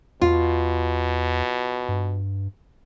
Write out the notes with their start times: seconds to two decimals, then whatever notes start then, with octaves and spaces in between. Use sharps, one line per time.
0.22 E2 B2 F4
1.88 G2